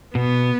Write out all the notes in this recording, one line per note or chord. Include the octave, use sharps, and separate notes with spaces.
B2 B3